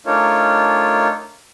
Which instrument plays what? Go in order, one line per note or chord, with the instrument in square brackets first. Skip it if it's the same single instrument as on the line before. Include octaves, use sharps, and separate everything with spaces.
[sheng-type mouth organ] A3 D4 D#4 F4 A#4 C#5